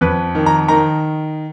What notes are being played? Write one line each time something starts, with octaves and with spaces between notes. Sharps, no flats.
F2 B4
D#3
A#5
D#3 A#5